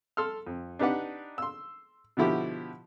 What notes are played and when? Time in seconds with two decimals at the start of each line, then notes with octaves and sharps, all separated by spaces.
0.17 A4 C6 F6
0.47 F2
0.79 D4 D#4 G4 B4 D5 F#5
1.38 C6 E6
2.17 B2 D3 F3 E4 F#4 G4